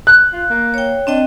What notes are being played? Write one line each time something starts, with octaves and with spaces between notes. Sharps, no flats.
F#6
F4
A#3
C#5 G5
C4 D4 D#5 G5